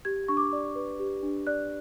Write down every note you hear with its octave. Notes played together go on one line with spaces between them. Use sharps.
G4 G#6
D4 C#6
D6
D5
B4
G4
D4
D5 F#6